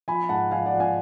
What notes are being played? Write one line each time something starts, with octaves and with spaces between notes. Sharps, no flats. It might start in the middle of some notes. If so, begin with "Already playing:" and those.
F3 G#5 B5
G#2 F#5 A5
F3 F5 G#5
D5 F#5
F3
F5 G#5